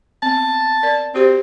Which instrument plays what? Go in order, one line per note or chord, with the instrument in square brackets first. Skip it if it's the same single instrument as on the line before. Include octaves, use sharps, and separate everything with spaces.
[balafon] B3 C4 [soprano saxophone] A5
[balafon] A#4 D5
[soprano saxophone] C4 [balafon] F#4 G4 C5